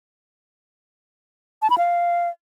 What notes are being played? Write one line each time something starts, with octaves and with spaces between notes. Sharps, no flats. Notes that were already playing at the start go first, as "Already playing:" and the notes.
A5
B5
F5